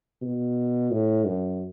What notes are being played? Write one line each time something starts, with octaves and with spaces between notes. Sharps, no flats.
B2
A2
F#2